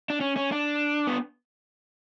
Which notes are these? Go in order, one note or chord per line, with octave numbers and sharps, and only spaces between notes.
D4
C#4
C#4
D4
B3